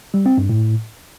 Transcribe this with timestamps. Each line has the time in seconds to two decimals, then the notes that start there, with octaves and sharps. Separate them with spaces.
0.14 G3
0.26 C4
0.38 G2
0.49 A2